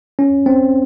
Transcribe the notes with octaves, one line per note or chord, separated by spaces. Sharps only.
C#4
C4